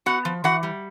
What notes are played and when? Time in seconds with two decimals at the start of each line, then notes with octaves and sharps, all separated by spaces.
0.06 B3 F#4 F#5
0.25 F3
0.44 E3 F#4 F#5
0.63 G3